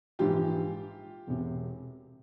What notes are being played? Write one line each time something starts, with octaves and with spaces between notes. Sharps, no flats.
A#1 G#2 E3 F4 G4
E1 E2 C3